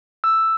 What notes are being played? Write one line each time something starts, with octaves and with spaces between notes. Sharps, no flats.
E6